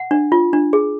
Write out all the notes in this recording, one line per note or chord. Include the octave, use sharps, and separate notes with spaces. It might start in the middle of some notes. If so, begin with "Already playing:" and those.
Already playing: F#5
D4
F4
D4
G#4